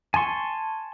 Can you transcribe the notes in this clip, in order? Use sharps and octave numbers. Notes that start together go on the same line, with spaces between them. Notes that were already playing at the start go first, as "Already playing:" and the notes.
G#5 A5 C6 C#6